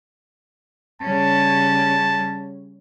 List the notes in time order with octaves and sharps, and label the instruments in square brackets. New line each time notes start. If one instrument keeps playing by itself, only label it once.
[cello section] C#3 G3 C#4 [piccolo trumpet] A5